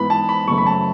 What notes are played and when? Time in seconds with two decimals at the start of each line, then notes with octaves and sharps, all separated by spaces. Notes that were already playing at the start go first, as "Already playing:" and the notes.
Already playing: G#2 E3 B3 B5
0.10 A5
0.29 B5
0.47 F#2 C#3 F#3 A3 C#6
0.58 B5
0.66 A5